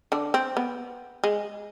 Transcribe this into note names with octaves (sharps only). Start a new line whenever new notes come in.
D3 D4
C4
B3
G#3